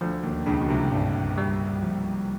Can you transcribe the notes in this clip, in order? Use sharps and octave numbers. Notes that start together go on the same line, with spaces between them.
D2 D3 F3
D#2 D#3
C#2 C#3 D4
B2
C2 C3
G2
G3
F3